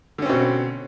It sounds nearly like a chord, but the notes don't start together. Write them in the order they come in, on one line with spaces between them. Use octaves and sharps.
D3 C#4 C4 B2